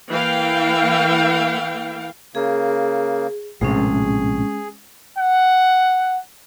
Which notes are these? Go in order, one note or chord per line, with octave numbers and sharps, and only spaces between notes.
E3 A#3 F5 G5
C#3 A#3 G#4
A#1 A2 C3 G#3 C#4 G#4
F#5